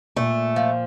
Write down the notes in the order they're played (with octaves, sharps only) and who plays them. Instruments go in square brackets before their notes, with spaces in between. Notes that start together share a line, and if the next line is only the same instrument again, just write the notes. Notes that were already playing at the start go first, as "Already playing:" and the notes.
[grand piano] A#2 [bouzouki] A3
[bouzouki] F3